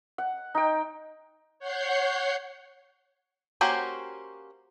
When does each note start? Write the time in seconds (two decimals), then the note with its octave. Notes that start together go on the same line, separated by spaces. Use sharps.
0.18 F#5
0.55 D#4 G5
1.59 C#5 F#5 G6 C7
3.61 A#3 C#4 F#4 G4 C5